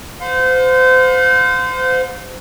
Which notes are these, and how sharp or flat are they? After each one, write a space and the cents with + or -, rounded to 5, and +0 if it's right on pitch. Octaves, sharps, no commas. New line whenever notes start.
C5 -30 F5 +40